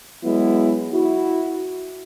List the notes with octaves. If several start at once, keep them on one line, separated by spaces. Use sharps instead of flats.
F#3 G#3 B3 E4
E4 F#4